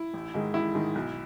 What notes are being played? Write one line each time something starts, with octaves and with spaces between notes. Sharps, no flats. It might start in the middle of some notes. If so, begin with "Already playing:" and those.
Already playing: E4
A1
G#2 D#3 G#3
A1 E4
G#2 D#3 G#3
B1